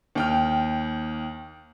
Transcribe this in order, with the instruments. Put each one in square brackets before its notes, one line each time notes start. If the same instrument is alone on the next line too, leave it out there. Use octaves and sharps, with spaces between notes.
[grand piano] D#2 G5 F6